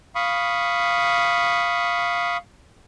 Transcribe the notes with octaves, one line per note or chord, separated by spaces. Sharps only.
F5 B5 C#6 D#6